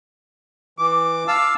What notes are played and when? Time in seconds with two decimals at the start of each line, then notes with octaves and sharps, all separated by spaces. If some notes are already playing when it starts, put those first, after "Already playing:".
0.79 E3 D6
1.28 F5 A5 E6